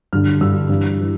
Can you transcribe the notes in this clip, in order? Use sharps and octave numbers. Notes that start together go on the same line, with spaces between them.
G2 D3 F6
G2 D3 E6
G2 E3
E3